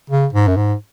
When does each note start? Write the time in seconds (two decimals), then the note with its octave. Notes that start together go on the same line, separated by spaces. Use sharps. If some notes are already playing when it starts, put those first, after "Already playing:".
0.10 C#3
0.33 G#2
0.47 F#2
0.57 G#2